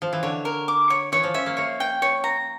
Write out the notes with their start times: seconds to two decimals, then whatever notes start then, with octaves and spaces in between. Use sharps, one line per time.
0.02 F3
0.13 E3
0.23 D3 C#5
0.45 A#4
0.68 D6
0.90 C#5
1.12 E3 C#5
1.23 F3
1.34 C#4 E5
1.46 A#3
1.57 A#3 C#5
1.80 G5
2.02 C#5
2.24 A#5